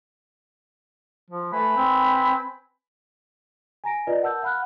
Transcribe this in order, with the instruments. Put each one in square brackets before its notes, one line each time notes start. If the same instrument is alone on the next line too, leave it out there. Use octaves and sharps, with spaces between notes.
[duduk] F3
[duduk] A3 [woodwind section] B4 G#5 B5
[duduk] C4
[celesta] G#5 A#5 A#6 D7
F4 B4 D5 D#5
A#4 F#5 A5 E6 G6
F5 F#5 B5 F6 F#6